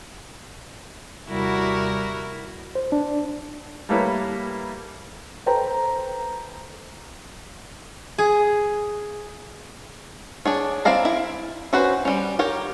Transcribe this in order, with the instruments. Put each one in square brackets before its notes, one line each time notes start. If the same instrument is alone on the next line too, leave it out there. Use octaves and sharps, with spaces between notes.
[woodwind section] D#2 C3 G3 [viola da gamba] E4 F#4 A#4
[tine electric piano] C5
D4
[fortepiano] G3 A3 A#3 E4 B4 C#5
[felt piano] A4 B4 C5 G5 A#5
[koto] G#4
[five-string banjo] D4 G#4 C#5
C4 E4 D5 F5 A#5
E4
C#4 F#4 B4 C5
G3 C#4
G4 A#4 C#5